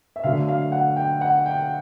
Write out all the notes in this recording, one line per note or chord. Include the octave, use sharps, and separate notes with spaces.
E5
D3 F#3 A3 F5
F5
F#5
G5
F#5
G5